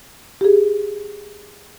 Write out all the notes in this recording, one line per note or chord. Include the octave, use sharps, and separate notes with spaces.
G4 G#4